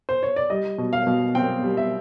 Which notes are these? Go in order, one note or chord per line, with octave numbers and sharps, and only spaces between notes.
C5
C#5
D5
G3 D#5
B2
F5
B2
C4 G5
G3
E5